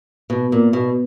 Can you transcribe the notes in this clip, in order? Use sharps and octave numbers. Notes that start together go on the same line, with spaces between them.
B2
A#2
B2